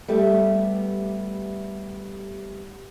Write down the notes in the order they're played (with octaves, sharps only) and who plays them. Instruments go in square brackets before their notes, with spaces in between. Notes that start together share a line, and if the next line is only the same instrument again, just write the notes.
[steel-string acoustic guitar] G3 A3 B3 G4